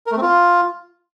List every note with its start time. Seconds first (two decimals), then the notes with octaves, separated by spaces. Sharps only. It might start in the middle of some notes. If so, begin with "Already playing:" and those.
0.07 A#4
0.12 A3
0.17 C4
0.22 F4